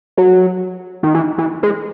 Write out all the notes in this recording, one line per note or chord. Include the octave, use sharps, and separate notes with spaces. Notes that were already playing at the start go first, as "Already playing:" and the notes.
F#3
D#3
E3
E3
G#3